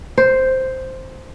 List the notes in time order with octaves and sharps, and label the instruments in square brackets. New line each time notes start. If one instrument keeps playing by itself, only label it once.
[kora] C5